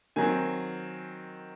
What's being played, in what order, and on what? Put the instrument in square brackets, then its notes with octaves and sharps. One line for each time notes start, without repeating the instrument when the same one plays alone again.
[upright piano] D#3 F#3 C4 G#5